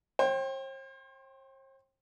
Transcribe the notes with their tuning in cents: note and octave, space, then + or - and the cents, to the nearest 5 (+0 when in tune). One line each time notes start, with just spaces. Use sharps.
C5 +45 G5 +0 C6 +0